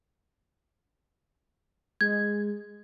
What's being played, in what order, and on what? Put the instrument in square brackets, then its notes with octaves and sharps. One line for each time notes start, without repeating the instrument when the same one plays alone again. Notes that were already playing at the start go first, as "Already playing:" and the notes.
[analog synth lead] G#3 [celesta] G#6